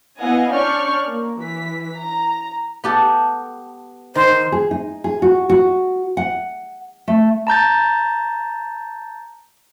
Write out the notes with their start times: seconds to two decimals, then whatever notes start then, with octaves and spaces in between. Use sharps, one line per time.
0.18 B3 E4 D#5 F5 F#5 G#5
0.53 C#4 D4 D5 C#6 F6 G6
1.09 A#3
1.42 E3 B6
1.97 A#5
2.84 B3 G4 A4
4.15 D#3 C5
4.52 G#4
4.71 D#4
5.04 G#4
5.22 F#4
5.49 F#4
6.17 F#5
7.08 A3
7.47 A5 A#5 G6 A6